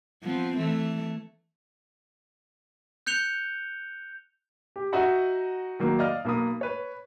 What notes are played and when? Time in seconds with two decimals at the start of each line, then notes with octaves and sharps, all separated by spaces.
0.23 F3 B3 C4
0.57 E3 A3
3.07 F#6 G6 C#7 F7 G7
4.76 G4
4.93 D#4 F#4 D#5 E5 F#5 A#5
5.80 D#3 F#3 A#3
5.99 D5 D#5 F5 F6
6.25 B1 A#3 B5 D#6
6.61 B4 C#5